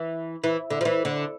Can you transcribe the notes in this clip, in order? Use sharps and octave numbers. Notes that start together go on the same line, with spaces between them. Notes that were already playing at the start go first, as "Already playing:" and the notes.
Already playing: E3
E3
D3
F3
E3
D3